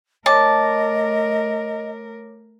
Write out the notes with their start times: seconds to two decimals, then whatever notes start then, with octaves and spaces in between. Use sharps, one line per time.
0.26 A3 A#4 C#5 D#5 A5 D6